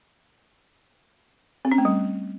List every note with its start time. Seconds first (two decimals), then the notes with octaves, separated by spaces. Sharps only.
1.65 C4
1.72 C#4
1.78 A3
1.85 G3